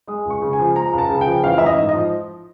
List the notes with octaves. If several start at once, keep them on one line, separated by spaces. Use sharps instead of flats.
G#3 D#6
C#2
C#6
C#3
G#5
F3
G#3 A#5
C#2
A5
C#3
G5
F3
A1 F5
A1 E5
D#5
G#2
D#5
F3